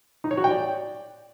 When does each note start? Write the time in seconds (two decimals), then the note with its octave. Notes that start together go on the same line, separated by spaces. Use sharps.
0.24 D#4
0.31 C#5
0.37 F#4
0.44 G5
0.51 D5